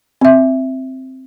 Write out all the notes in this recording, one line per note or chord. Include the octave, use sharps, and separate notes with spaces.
C4 E5